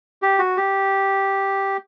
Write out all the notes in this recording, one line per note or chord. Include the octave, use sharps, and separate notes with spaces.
G4
F#4
G4